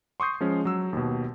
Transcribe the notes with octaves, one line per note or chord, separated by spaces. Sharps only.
C6 C#6 D#6 G6 C7
F3 G#3 C#4
F#3 E6
D#2 B2